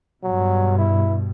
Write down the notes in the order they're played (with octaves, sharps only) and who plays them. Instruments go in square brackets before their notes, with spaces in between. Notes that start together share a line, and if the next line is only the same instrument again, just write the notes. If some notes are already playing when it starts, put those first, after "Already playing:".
[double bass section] G2 B2 [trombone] F#3
[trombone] E4